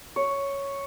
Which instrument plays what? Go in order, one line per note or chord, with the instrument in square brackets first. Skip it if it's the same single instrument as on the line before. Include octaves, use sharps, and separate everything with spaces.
[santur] C#5